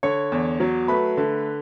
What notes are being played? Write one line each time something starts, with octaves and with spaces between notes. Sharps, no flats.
D3 C#5 C#6
E2
F#3
A3 B4 B5
D3